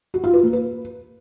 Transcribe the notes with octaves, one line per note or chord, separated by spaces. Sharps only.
F#4
F4
B4
A#3
B4